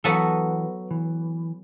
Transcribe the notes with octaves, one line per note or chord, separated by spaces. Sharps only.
E3 F#3 B3 F#4 A4
E3